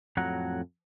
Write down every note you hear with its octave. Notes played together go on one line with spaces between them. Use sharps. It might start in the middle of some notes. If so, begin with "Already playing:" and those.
F2 A2 F#3 F#5 A#5